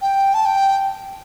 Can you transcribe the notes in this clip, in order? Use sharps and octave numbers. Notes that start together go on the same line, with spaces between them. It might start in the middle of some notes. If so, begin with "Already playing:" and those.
G5
A5
G5